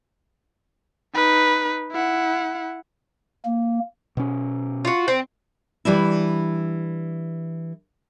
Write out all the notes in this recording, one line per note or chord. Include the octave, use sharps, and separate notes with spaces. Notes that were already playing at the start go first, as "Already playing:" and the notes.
D#4 B4
E4 F#5
A#3
B2 C#4
F4 F#4
C4
E3 G3 D4 E4